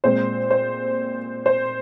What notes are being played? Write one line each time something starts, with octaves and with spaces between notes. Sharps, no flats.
A#2 G#3 C4 C5
C5
C5